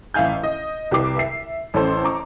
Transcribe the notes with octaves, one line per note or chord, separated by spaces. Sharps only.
A1 E5 F5 G#5 G6
D#5
C2 G4 B4 D6 C7
E5 C7
A1 C#4 A4 C5
A#5 C#6 D6